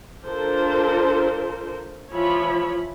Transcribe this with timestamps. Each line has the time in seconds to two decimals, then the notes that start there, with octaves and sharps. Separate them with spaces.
0.24 D4 F4 A4 A#4 C5
2.11 E3 F3 F4 C#5 E5 B5